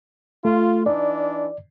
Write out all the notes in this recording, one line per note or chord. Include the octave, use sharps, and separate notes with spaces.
A3 F4
E3 D4 D#4 D5